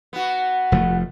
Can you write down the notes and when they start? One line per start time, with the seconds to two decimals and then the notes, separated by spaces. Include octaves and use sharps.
0.13 B3 F#4
0.72 F1 F3 A3